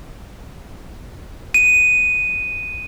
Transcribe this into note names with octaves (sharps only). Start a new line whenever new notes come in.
D#7